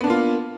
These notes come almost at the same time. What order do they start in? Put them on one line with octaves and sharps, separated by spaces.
B3 D4 A#3 F4